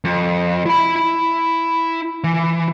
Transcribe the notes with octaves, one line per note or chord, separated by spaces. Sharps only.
F2
E4 B5
E3